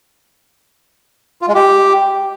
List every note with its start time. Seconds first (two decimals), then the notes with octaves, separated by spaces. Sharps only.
1.41 F4
1.48 G#3
1.55 G4